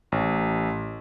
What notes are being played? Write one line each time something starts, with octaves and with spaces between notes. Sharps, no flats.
A1